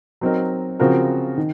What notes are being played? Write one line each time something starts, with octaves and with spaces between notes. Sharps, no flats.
F#3 C4 D#4 A#4
C#3 F3 C4 F#4 A#4
D#3